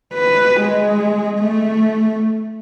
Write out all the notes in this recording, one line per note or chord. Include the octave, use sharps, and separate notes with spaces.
B4
G#3
A3